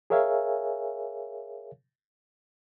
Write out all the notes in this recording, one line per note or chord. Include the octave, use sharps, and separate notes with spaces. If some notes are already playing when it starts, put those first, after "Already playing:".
G#4 A#4 C#5 E5 F5 G#5